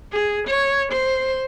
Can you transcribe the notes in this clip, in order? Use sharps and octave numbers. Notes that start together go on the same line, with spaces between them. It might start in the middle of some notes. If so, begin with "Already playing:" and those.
G#4
C#5
C5